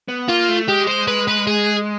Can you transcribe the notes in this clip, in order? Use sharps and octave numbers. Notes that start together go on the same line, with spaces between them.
B3
A#3 F4
A3
G#3 G4
C5
B4
B4
G#4